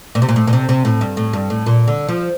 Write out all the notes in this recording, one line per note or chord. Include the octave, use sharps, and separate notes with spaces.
A#2
C3
A#2
A2
A#2
C3
C3
A2
G2
A2
G2
A2
A#2
D3
F3